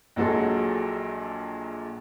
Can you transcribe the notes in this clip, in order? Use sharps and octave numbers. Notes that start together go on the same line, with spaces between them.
A#1 A#2 F#3 G#3 A4